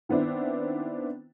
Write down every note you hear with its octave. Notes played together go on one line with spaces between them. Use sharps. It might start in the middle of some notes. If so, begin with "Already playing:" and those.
D#3 B3 C4 D4 E4